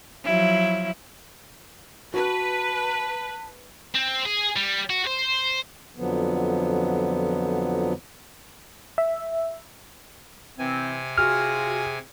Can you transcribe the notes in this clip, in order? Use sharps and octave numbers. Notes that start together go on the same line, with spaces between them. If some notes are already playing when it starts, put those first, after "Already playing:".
F3 F#3 E4
F#4 B4 A5
C4
G#4
G3
F#4
C5
F2 D3 F3 F#3 B3
E5
C3 E3 C4 G#5
F4 F#4 G#4 F6